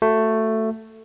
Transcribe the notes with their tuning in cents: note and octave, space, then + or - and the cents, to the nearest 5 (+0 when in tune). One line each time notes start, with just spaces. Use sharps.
A3 +10 F#4 +0